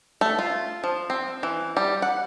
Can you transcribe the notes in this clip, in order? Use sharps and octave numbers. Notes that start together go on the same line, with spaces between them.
A3
F4
F3
C4
E3
G3
F#5